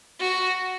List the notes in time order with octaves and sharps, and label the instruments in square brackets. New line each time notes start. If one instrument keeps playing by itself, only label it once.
[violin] F#4